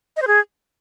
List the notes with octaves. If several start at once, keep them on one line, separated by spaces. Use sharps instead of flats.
D#5
C5
G#4